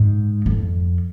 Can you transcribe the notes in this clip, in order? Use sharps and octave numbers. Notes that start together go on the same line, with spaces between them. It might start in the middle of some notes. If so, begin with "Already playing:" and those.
Already playing: G#2
F2